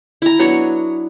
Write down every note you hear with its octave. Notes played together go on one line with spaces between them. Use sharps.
E4 A#5
F#3 B3 D4 C#5